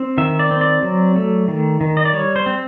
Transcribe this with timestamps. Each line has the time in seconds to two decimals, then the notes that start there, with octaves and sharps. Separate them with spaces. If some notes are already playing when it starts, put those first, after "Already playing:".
Already playing: C4
0.18 D#3 E5
0.39 D5
0.51 C4
0.61 D5
0.82 F#3
1.16 A3
1.48 D#3
1.81 D#3
1.97 D#5
2.05 D5
2.13 G3 C#5
2.36 C5
2.46 C4